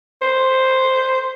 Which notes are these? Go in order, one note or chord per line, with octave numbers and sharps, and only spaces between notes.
C5